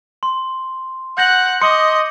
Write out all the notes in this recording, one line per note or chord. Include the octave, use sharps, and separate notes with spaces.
C6
F#5 G6 A#6 F#7
D#5 C6 D6 D#6 C#7